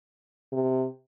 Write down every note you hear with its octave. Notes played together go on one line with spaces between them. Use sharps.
C3